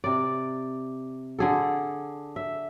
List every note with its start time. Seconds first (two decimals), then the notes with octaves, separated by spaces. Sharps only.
0.04 C3 D5
1.39 D3 G#4 A4
2.36 E5